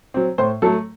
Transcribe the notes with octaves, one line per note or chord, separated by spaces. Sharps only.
F#3 C4
A2 C5
F#3 A3 A4